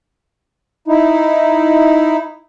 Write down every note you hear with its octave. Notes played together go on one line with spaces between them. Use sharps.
D#4 E4